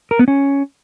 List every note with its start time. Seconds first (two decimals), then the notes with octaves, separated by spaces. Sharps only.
0.11 A#4
0.19 B3
0.28 C#4